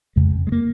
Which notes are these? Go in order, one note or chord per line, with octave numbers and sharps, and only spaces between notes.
F2 C#3 G#3
G#3
A#3